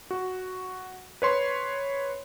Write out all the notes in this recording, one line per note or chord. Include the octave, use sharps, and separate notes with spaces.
F#4
B4 C#5 C6